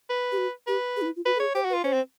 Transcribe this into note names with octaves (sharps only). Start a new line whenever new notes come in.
B4
G4
F#4
G4 B4
G#4
D#4
E4
F4
F#4 B4
A4
G#4 C#5
G4 C5
F#4
B4
F4
C#4 C5
C4